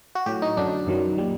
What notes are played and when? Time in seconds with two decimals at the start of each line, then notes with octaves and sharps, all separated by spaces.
0.15 F#4
0.26 A2 F#3 G4
0.42 D#4
0.57 F#2 D3 F#3 D4
0.87 F#2 D#3 F#3
1.18 A#2 G3